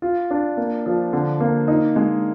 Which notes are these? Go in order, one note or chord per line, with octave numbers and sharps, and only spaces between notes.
F4
D4
A#3
F3
D3
A#3
D#4
G#3